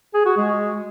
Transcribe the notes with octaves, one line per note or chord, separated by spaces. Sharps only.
G#4
F#4
G#3